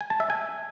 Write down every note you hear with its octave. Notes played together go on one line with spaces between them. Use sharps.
G#5
A5
E5
G#5